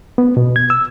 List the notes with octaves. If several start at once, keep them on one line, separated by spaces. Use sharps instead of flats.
B3
B2
G#6
E6